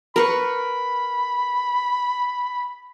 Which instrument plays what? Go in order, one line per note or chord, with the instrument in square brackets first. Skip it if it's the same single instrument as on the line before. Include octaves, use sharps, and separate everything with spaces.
[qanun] A#4 B4 C#6 [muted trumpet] B5